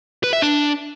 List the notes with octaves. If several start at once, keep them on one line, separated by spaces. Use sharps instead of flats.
B4
E5
D4